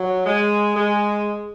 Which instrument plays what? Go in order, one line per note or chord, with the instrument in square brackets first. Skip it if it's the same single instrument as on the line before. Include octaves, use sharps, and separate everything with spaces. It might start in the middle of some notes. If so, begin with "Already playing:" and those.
Already playing: [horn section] F#3
G#3
G#3